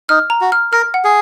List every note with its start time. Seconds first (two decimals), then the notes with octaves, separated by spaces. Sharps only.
0.09 D#4 F6
0.30 A#5
0.41 F#4
0.52 F6
0.72 A#4 F6
0.94 F#5
1.04 G#4